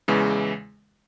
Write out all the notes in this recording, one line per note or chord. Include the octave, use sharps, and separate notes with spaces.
E2 C#3 E3 G#3